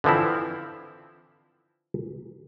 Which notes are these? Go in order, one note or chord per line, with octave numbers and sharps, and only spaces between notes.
D3 E3 F3 C4 E4